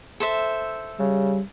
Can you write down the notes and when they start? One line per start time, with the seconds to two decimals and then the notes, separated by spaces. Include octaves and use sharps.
0.20 A4 C5 E5
0.99 C#3 G3